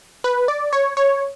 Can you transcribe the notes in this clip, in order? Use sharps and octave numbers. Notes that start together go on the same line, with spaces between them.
B4
D5
C#5
C#5